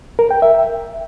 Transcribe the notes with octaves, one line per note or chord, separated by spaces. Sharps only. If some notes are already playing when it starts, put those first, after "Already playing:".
A#4
G5
E5